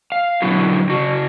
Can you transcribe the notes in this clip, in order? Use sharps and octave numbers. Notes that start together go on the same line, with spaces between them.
F5
B2 D3 F#3 E4 F#4
C#3 F#4